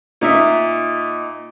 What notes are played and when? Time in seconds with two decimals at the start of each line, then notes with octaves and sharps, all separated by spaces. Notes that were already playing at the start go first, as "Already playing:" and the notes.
0.21 A#2 D#4 E5